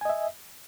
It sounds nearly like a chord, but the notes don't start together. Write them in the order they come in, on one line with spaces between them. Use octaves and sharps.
G#5 D#5 E5